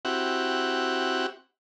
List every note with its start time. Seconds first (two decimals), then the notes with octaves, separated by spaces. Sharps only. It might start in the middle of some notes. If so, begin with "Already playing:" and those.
0.05 C4 E4 F#4 G4 F#5